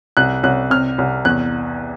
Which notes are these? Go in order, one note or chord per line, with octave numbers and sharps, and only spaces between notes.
C2 F#6
C2 F#6
C3 F6
C2
E2 F#6